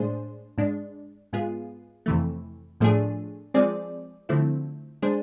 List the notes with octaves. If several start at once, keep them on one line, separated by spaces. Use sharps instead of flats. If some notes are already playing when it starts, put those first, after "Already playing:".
Already playing: A2 G#3 D4 G#4 C5
G#2 G#3 D4
G#2 G#3 B3 F4 G#4
F2 C3 E3 A3
A2 F3 A3 D4 G#4
F3 G#3 C4 G#4 D5
D3 F3 A3 C4 E4
G#3 D4 G#4 C5